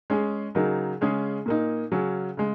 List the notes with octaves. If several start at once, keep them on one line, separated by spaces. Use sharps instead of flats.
G#3 C#4 G#4
C#3 F#3 D#4 A#4
C#3 G#3 C#4 G#4
A#2 A#3 D#4
C#3 F#3 C#4
C#3 G#3